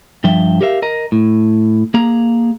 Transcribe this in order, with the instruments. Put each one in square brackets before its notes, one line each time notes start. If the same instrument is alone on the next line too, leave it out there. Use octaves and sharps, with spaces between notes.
[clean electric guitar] G2 F3 E5 G5
G4 A#4 C#5 E5 F5
A#4 D#5 A#5
A2
A#3 G#4 A#5